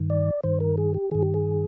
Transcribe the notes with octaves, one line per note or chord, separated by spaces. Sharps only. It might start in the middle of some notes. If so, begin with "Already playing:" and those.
Already playing: G2 D#3
D5
G2 D#3 C5
A#4
G#4
G4
G2 D#3 G#4
G4
G#4